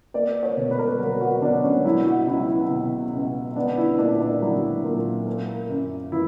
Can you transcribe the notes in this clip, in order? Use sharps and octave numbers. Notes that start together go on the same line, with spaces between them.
A#3 D5
C#5
B2
B4
A#4
B4
F#3 A#4
F#4
B2 D4
C#4
F#3 E4
F#4
C#2 E4
E4
B2
C#2
B3 D4
E4
A#2 D4
D4
F#3 E4
A#2
A#3
F#2
E3 E4